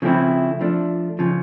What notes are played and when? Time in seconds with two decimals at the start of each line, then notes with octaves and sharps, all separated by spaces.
0.02 C#3 F3 A3 C4 E4
0.61 F3 A3 D4
1.19 C#3 F3